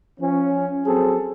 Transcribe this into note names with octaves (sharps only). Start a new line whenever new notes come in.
F3 C#4
F#3 C4 G#4 A4